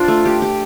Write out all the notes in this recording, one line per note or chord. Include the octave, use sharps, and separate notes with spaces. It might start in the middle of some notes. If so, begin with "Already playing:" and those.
Already playing: D4 F4 C5
A3
G4
G4